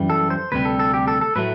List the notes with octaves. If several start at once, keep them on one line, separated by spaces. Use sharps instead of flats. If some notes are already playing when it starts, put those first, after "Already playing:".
Already playing: F#2 E3 G3
A4
C5
D2 C3 G3 B4
A4
A4
G4
A4
A4
A2 F#3 A3 B4